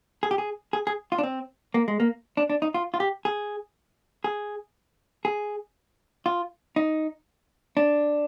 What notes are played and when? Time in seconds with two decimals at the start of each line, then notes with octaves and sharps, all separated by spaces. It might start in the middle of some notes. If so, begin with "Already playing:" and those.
0.23 G#4
0.31 G4
0.38 G#4
0.73 G#4
0.87 G#4
1.12 F4
1.18 D4
1.23 C4
1.74 A#3
1.88 G#3
2.00 A#3
2.37 D4
2.50 D4
2.62 D#4
2.74 F4
2.94 F4
3.00 G4
3.25 G#4
4.24 G#4
5.25 G#4
6.26 F4
6.76 D#4
7.77 D4